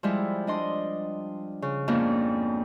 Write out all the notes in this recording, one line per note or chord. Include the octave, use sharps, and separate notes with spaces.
F3 G3 G#3 E4
D4 D#5 C6
C#3
F2 G#2 A#3 B3 C#4 D4